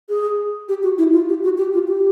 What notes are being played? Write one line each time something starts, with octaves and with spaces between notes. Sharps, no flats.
G#4
G4
F#4
E4
F4
G4
F#4
G4
F4
G4